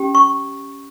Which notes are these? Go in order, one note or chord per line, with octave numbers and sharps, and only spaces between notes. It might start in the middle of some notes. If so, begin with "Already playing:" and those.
Already playing: C#4 G4
C#6